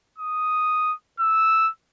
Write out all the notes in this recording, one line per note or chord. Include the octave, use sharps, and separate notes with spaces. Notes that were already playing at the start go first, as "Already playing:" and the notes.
D#6
E6